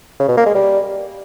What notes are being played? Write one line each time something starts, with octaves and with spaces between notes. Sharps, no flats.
C#3
B2
A#3
G#3
G3